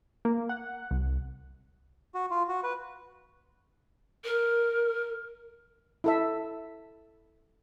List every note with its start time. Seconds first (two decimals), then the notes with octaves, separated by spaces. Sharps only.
0.25 A#3
0.49 F#5
0.91 C2
2.14 F#4
2.31 F4
2.48 F#4
2.63 B4
4.25 A#4
6.04 E4 A4 E5